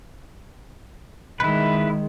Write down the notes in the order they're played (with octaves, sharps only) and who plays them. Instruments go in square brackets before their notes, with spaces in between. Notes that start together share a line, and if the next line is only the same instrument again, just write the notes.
[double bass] D#3 G#3 [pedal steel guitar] E4 B4